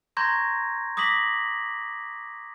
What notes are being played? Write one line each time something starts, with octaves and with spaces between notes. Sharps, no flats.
A#5 C6 C#6 G6 G#6 A#6
D6 D#6 A#6 B6 F#7